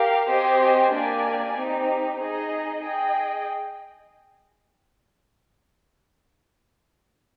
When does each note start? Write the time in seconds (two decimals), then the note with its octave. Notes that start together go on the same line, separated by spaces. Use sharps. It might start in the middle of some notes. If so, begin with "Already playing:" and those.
Already playing: G4 A#4 F5
0.29 C4 G4 C5 D#5 G#5
0.92 A#3 D4 G4 D5 G#5
1.56 C4 D#4 G4
2.19 D#4 G#4 D#5
2.82 G#4 D#5 G5